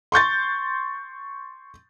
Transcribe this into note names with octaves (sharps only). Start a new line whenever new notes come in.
C6 C#6 G6 A6